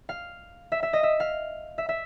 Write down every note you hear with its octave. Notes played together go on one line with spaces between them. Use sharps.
F5
E5
E5
D#5
E5
F5
E5
E5